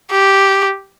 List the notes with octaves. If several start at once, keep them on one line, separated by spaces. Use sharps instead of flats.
G4